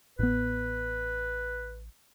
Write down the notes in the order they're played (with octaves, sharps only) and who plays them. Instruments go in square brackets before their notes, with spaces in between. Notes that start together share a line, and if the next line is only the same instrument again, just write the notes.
[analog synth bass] A1 [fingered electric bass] A2 B3 [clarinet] B4